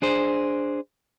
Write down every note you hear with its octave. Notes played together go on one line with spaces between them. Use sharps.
D4 G#4 C5